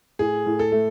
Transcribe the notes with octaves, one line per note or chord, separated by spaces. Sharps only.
A2 G#4
A2
A4
A3